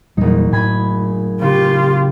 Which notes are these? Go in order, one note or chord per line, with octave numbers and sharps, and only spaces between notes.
F#1 E2 A#2 G3 D#4
A2 G#5 B5 G#6
C#3 F4 G4